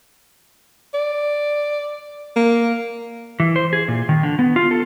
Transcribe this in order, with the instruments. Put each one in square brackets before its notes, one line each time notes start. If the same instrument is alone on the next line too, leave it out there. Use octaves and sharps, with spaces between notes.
[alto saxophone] D5
A#3
[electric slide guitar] E3
C5
G#4
A#2
D#3
D3
B3
F4
A4